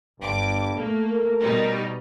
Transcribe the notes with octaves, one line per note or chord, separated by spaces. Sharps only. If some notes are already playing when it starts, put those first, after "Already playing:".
G1 G2 D6
A3 A#3
A#4
B2 G3 D#4